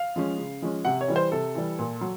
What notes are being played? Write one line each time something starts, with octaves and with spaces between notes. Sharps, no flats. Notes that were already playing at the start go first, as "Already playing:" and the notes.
Already playing: F5
F3 G#3 C#4
C#3
F3 G#3 C#4
C3 F#5
C#5
E3 G3
C5
C3 A4
E3 G3
A#2
F#3